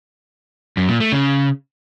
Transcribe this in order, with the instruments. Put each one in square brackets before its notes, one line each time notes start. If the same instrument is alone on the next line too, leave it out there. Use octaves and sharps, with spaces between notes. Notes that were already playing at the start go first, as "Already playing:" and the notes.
[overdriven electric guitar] F#2
A#2
A3
C#3